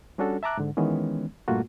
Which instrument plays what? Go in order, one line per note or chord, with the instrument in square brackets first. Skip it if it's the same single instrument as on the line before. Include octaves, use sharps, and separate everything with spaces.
[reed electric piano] G3 C#4 D4 F#4 A4
E5 A5 A#5 D6 F#6
G#2 D3
D#3 E3 G#3 B3 C#4
G2 A#2 A3 A#3 F4 F#4